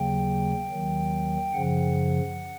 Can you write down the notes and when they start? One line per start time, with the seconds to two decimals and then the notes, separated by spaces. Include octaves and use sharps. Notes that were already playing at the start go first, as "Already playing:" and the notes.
Already playing: D#2 C#3 F#3 A#3 G5
0.71 D#2 D#3 F#3
1.53 F#2 C#3 F3 F#5